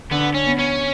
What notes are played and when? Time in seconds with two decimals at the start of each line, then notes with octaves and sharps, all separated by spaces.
0.11 D3 B3
0.34 C#4
0.46 B3
0.59 C#4